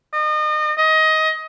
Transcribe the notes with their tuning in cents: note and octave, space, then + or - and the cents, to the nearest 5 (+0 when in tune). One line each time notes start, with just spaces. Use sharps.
D#5 -35
D#5 +20